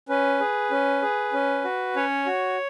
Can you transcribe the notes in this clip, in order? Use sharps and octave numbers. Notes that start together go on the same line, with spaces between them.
C#4 B4
G#4
C#4
G#4
C#4
F#4
C#4 C#5
F#4